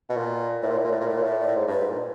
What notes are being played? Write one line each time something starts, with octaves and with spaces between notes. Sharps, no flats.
B2
A#2
A2 B4
A#2 A#4
A2
A#2
A2
A#2
A2 A#4
A#2
A2 C#5
D5
A2
G#2
G2
B4
G#2
A#2